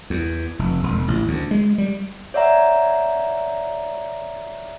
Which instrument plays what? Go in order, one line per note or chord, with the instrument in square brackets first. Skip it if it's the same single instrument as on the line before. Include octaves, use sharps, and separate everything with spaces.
[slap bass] E2
F1
E1
A1
D2
G#3
G3
[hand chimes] C#5 D5 E5 F#5 A#5